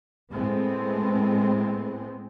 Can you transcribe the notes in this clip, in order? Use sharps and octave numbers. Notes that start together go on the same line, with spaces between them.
A2 G#3 A3 B3 C4